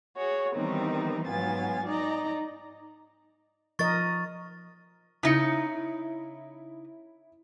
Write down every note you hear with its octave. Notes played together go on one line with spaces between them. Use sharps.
F#4 G#4 C#5
D#3 E3 G3 B3 C4 D#4
G#2 F#3 B3 F4 G#5 A6
D#4 D5 D#5 A#5
F3 A#4 D#5 C#6 A6
C#3 D#4 E4 C#7